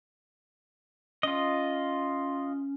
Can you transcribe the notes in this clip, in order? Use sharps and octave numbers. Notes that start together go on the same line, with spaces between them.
C#4 F4 D#5